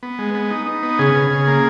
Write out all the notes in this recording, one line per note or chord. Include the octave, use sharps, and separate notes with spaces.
B3
G#3
B3
D#4
D#4
B3
C#3 G#4
C#3
C#3
A#3